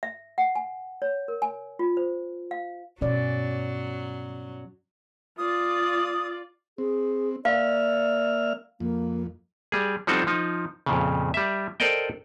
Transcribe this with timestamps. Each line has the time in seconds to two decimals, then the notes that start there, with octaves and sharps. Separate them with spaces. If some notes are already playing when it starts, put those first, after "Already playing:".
0.03 E5
0.38 F#5
0.55 G#5
1.02 C#5
1.28 A#4
1.42 G#5
1.79 F4
1.97 C5
2.51 F5
3.01 G2 B2 F#3 C#4 D5
5.38 F4 D5 D#6
6.78 C4 G#4
7.45 A#3 D5 E5 F5 F6
8.80 F2 A#3
9.72 G3 G#4
10.07 F3 G3 C4 D#4 F#4 A4
10.27 F3 D#4
10.86 F2 A#2 C#3
11.34 G3 E5
11.80 A4 A#4 C5 D5 D#5 G5